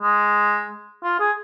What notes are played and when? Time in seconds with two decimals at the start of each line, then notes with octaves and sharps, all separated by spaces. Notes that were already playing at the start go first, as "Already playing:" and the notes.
0.03 G#3
1.04 F4
1.20 G#4